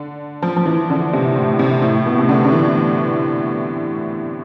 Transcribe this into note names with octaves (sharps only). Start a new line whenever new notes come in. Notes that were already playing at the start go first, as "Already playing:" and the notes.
Already playing: D3
F3
F3
E3
D3
C3
A2
C3
A2
B2
C3
D3
D3
E3